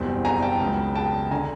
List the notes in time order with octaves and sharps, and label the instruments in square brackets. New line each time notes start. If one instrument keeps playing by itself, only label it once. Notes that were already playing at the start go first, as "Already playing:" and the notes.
Already playing: [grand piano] F#1 E2 B2 G3 C4
[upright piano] G#5 A#5
G5 A5
[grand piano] C#2 C#3 F#3 B3
[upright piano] G5 A5
[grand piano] D3 [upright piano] G#5 A#5